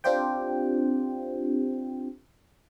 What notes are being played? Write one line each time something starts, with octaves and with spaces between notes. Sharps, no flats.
C4 D4 F4 G4 C5 G5